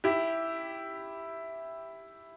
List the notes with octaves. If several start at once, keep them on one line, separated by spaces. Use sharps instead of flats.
E4 G4